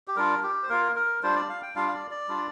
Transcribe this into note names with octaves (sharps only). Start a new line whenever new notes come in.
G4
G3 D4 F4 A#4
G4
C5
A#3 F4 A#4
A#4
G3 D4 F4 C5
D5
F5
G5
G3 D4 F4 F5
F5
D5
D5
G3 D4 F4